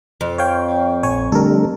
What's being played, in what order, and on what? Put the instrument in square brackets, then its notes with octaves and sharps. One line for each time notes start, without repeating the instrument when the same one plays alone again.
[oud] F2
[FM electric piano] C#5 F5 G5
A#1 C#5 G#5
[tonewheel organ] D3 G3 A3 [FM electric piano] A4 A#4